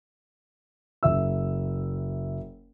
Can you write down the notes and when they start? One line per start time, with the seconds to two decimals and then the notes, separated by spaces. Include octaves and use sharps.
1.03 F#1 E5 E6